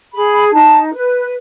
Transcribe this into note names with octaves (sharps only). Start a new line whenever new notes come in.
G#4 B5
D#4 A5
B4